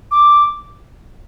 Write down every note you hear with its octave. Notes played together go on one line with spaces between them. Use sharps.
D6